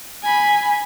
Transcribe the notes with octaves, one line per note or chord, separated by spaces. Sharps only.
G#5 B5